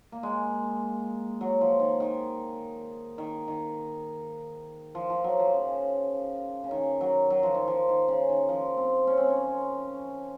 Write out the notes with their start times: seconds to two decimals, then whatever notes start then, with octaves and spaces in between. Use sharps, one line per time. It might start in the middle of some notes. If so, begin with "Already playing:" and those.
0.12 A#3
0.23 G#3
1.41 F#3
1.61 F3
1.80 D#3
2.00 D#3
3.18 D#3
3.48 D#3
4.95 F3
5.10 F3
5.24 F#3
5.39 F3
5.54 C#3
6.64 C#3
6.71 D#3
7.01 F#3
7.30 F#3
7.43 F3
7.55 D#3
7.67 F3
7.89 D#3
8.08 C#3
8.29 D#3
8.49 F3
8.77 C4
9.07 C#4
9.18 C4
9.28 C#4